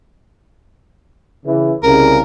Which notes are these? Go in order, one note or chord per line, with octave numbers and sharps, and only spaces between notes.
C#3 E3
C2 C#3 A#4